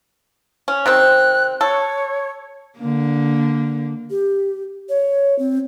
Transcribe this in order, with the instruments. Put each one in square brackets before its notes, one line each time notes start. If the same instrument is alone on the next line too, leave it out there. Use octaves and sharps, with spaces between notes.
[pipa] C#4
[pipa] C3 D#3 C4 [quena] F#6
[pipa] A4 [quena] C#5
[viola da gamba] D3 A#3
[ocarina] G4
C#5
C4